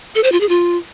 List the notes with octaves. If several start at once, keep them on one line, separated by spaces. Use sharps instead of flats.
A4
C5
F4
G#4
F4